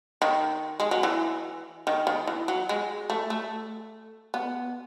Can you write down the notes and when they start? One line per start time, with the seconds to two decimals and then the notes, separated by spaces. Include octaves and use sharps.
0.22 D#3
0.80 G#3
0.91 F#3
1.03 E3
1.87 D#3
2.07 D#3
2.27 E3
2.48 F#3
2.69 G#3
3.10 A3
3.30 A3
4.34 B3